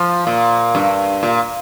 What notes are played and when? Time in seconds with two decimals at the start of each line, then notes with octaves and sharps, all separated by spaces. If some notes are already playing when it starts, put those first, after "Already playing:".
Already playing: F3
0.27 A#2
0.75 G2
1.23 A#2